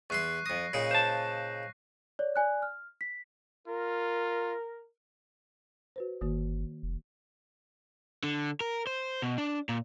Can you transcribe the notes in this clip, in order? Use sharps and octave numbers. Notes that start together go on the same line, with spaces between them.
E2 E5 C6 C#6 F#6 C7
F2 D#6 A#6
A#2 C#3 D#4
C5 A5
C#5 D5
D5 G#5 F#6
F6
B6
F4 A#4
F#4 B4 C5
G1 D#3 A#3 F#4
F1
D3
A#4
C5
B2
D4
A#2